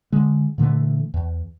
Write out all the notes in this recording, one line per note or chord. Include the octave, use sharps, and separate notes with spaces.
D3 G#3
A#2 D3 E3 A3
E2